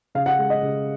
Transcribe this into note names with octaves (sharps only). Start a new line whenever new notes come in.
C#3 F5
F#5
G#3
D#5
C#3